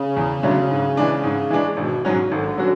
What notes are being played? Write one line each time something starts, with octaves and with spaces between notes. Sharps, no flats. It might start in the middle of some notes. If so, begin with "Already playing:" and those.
Already playing: C#3
E2
D3 F#3 A3 C#4
G#2
E3 G#3 D4
G#2
E3 G#3 D4
G#1 B2
G#2 C#3 F#3 C#4 F#4
C#3
G#1 D3
F#3 C#4 F#4